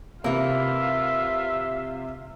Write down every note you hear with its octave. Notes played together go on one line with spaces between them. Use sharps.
C3 E3 A#3 F4 E5